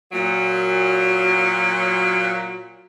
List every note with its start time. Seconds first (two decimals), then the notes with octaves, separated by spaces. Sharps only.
0.11 A#2 F#3